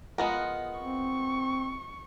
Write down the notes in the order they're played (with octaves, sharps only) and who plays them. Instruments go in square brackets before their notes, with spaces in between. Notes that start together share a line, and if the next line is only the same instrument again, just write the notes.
[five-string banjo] G#3 B3 A#4 [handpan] F4 D#5 F#5
[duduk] C4 [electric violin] C#6